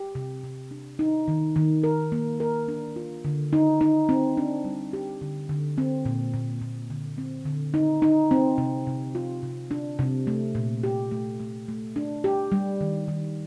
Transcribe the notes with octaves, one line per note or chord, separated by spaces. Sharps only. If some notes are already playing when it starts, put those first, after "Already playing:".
Already playing: G4
C3
C3
D4
D#4
D#3
D#3
A#4
A#3
A#4
D4
F4
D3
D#4
D#4
C4
D4
G3
G4
D3
D3
C4
A#2
A#2
A#2
D3
C4
D3
D#4
D#4
C4
C3
C3
F4
C3
D4
C3
A3
A#2
G4
A3
A3
A3
D4
G4
G3
D#3
D#3